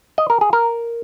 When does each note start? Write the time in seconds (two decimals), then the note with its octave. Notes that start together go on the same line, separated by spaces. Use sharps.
0.18 D#5
0.30 A#4
0.41 G#4
0.53 A#4